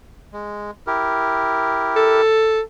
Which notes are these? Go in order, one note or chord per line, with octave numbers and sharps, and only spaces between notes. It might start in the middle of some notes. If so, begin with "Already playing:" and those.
G#3
E4 G4 A#4
A4